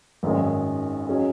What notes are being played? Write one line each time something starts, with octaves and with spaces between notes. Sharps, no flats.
G#1 F#2 D#3 G#3
F#3 C#4 G#4 D#5